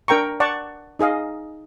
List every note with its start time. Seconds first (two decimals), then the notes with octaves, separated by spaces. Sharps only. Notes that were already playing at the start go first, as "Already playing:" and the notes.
0.08 D4 A#4 G5 A#5 C#6
0.40 D5 F#5 A5 C#6
0.99 D#4 G#4 D#5 F5